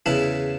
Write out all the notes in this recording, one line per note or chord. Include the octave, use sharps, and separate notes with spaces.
E2 C#3 E3 E4